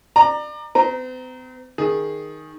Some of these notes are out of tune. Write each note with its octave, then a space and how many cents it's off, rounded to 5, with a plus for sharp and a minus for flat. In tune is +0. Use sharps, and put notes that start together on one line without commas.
D5 +30 A#5 +0
C4 -45 A#5 +0
D#3 +5 G#4 +0